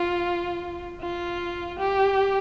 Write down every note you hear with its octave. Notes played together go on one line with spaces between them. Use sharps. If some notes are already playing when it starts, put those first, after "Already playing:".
Already playing: F4
F4
G4